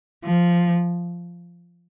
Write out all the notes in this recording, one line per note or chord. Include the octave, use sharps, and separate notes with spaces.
F3